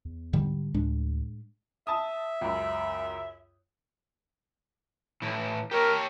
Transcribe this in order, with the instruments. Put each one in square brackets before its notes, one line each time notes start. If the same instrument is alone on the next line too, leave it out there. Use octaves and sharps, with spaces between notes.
[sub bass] E2
[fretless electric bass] G#2 D3 G3
[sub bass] D2 [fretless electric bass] A2 G#3 D4
[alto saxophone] E5 [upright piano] A5 D#6
[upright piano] C#2 F#2
[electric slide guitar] A2 E3
[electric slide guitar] G4 C#5 [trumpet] A#4